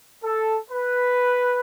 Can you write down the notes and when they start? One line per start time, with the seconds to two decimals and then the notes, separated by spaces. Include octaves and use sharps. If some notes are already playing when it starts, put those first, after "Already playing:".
0.24 A4
0.71 B4